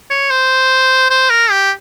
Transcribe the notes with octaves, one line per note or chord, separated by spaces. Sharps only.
C#5
C5
C5
A#4
G4